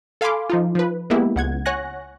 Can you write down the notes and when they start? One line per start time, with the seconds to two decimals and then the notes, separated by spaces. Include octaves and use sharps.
0.21 A4 F5 G#5 B5 C6 D6
0.50 F3 D#4 F4
0.75 F3 B4
1.10 G#3 A#3 B3 E4 G4
1.36 C#2 F#5 G#6
1.66 C#5 F#5 G#5 C#6 F#6 A#6